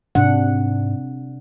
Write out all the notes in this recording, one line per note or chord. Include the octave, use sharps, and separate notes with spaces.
G#2 C3 D4 F#5